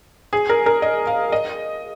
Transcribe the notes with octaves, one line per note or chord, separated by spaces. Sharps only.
G#4
A#4
A#4
D#5
F5
D#5